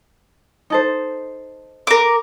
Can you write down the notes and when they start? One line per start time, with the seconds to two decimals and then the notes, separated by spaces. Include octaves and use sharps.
0.70 D#4 A4 C5
1.87 A#4 D6